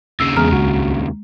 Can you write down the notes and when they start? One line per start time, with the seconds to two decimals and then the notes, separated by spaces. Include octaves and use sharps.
0.20 D#2 C#3 E6 C7
0.36 E2 G#3 G#4 A#5 F6
0.52 C#2 G#3 F#4